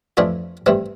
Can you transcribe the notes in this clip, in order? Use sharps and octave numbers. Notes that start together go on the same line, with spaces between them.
F2 E3 A3 D4 F4
G2 E3 A3 C4